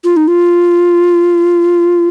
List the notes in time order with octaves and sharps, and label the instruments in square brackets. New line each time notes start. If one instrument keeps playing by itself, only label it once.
[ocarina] F4
D#4
F4